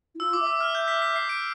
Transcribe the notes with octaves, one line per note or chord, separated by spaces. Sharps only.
E4
F4 E6
D6
E5
E6
F6
G6
B6
B6
C7
D7